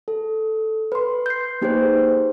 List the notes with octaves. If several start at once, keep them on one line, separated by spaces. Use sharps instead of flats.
A4
B4 C6
G6 C7
A#3 D#4 G4 G#4 B4 C5